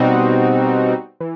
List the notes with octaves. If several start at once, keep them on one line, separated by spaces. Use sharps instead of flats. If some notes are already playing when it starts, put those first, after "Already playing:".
Already playing: B2 G3 C4 D#4 F#4
E3